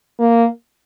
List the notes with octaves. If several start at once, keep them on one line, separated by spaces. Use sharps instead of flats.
A#3